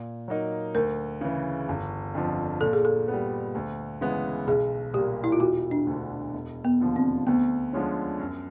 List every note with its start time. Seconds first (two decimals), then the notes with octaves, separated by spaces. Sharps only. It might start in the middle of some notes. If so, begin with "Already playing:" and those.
Already playing: A#2
0.28 F#3 A#3 D#4
0.75 D2 A#4
1.21 C#3 E3
1.69 G1
2.14 F2 D3 F3
2.61 A#2 A4
2.73 G#4
2.85 A4
3.08 B3
3.13 G3
3.55 D2
4.01 C#3 E3 G#3 B3
4.47 B1 G#4
4.93 A#2 G3 A#3 G4
5.24 E4
5.32 F4
5.40 E1 F#4
5.71 D4
5.87 D2 D3
6.34 E1
6.65 B3
6.80 D#2 D3 F3
6.96 C4
7.27 D2 B3
7.73 D3 F3 G#3 C#4
8.19 F#2